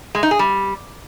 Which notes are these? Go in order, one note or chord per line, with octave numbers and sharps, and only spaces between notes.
G#3
D#4
G#4
G3